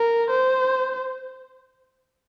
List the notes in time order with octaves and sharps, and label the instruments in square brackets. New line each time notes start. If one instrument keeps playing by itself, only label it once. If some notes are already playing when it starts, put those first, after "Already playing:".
Already playing: [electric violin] A#4
C5